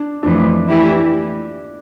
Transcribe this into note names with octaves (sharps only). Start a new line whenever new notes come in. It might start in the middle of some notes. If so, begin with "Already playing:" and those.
Already playing: D4
F2 E3 A3 D4
E3 A3 E4 G4